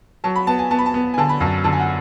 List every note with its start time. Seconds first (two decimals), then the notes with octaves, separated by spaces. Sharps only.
0.24 F#3 A5
0.36 B5
0.47 B3 A5
0.59 G#5
0.71 B3 A5
0.79 B5
0.86 A5
0.94 B3
1.14 G#5
1.18 D3 A5
1.29 B5
1.40 F#2 A5
1.64 D3 A5
1.73 G#5
1.80 F#5